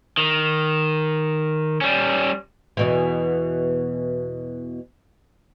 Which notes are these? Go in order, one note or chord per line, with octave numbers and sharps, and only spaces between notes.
D#3
G3 C#4
E2 B2 E3